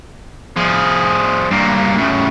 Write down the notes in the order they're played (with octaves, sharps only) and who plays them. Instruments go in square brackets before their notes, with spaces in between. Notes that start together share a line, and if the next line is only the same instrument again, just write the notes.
[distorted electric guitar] F3 G#4
G2 A#3
A2 C#3